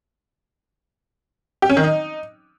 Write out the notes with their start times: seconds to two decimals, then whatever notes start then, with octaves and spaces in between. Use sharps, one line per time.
1.62 G4
1.70 C#4
1.77 D#3
1.84 D#4